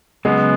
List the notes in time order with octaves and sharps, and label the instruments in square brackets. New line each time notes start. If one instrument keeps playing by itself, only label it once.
[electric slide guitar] C#3 F#3 B3 [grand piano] G#3